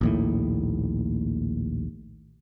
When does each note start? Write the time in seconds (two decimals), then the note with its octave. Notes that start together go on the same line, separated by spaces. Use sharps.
0.01 A#1 D#2 A2